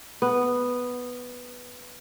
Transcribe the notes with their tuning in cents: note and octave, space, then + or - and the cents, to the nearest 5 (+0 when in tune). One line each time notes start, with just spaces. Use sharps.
B3 +0